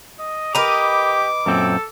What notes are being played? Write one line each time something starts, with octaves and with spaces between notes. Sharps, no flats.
D#5
G4 A#4 B4 D#5 A#5 D6
F#2 A#2 C4 A4